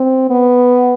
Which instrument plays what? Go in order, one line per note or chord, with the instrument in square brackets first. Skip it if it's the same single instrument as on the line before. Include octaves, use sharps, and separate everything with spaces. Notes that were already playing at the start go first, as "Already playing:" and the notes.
Already playing: [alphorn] C4
B3